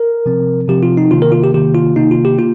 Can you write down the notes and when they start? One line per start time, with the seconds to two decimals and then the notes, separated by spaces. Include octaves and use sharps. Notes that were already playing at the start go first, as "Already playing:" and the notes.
Already playing: A#4
0.26 C3 F3 C4
0.68 C3 F3 C4 G4
0.83 F4
0.97 D#4
1.11 C3 D#3 A#3 F4
1.22 A#4
1.32 F4
1.44 G4
1.54 C3 D#3 A#3 G4
1.75 F4
1.96 C3 D#3 A#3 D#4
2.11 F4
2.25 G4
2.38 A#3 F4